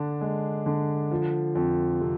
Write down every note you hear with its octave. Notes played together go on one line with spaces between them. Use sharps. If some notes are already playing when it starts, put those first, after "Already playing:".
Already playing: D3 D4
G#3
D3
F3
F2
C3